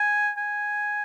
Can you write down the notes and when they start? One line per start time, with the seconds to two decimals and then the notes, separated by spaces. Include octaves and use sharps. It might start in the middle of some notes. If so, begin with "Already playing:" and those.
Already playing: G#5
0.37 G#5